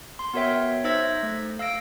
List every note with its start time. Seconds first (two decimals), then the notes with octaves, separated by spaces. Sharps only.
0.19 C6
0.34 B3 F#4 A#4 C#5 E5 G5
0.84 D#4 C5 E5 E6 G#6 A#6
1.23 A3
1.59 F5 E6 A#6 D7